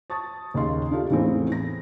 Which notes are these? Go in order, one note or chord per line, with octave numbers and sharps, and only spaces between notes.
A5 C#6 D#6 A6
D#2 C#3 D#5 C6
D4 F4 G4 A4 F5
E2 A2 E3 A#3 C4 C#4
A#6